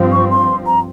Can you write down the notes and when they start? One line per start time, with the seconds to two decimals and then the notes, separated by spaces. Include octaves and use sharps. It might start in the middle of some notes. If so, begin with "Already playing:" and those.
Already playing: G2 F3 C4
0.12 C#6
0.31 C6
0.66 A#5